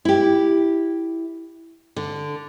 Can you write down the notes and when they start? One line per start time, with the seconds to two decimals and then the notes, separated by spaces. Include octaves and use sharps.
0.05 E4 G4
1.96 D3